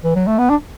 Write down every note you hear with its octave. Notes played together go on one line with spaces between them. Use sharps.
E3
F#3
A3
B3
D4